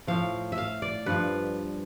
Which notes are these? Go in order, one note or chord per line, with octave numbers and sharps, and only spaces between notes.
A2 F3 F5
E5
F5
D5
G2 F3 B4